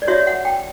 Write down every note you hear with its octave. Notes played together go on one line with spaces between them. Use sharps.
D5
F#4 C#5 E5
F#5
G5